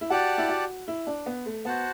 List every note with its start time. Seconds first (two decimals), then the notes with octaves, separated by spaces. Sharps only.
0.01 E4
0.10 F#4 G4 D5 F#5 A5
0.38 E4
0.48 F#4
0.88 E4
1.07 D4
1.26 B3
1.46 A3
1.65 B3 F#4 C5 F#5 A5